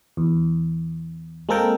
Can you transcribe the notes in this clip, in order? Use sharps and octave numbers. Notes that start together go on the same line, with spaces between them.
E2
G#3 A#3 C4 A4 A#4 G5